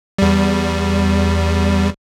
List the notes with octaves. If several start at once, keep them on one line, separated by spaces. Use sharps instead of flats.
E2 G3